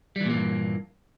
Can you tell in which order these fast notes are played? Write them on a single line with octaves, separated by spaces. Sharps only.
G3 E3 A#2 A#3 G2